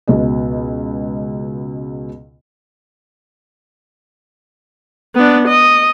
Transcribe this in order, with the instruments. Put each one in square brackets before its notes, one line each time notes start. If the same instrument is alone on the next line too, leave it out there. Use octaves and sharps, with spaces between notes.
[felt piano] C#2 B2 D#5
[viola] B3 D4
D#5